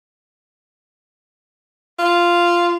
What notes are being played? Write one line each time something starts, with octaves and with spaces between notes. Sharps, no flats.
F4